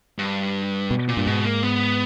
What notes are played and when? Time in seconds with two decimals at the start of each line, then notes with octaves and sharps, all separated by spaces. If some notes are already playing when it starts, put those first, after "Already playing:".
0.18 G2
0.91 B2
1.08 A#2
1.17 G2
1.27 G#2 B2
1.45 A#3
1.63 B3